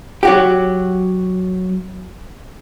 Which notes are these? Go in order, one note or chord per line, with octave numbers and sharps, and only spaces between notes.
F#3 F#4 G4